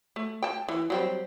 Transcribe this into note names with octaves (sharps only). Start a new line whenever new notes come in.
A3
G5 A5
E3
F#3 G3 C4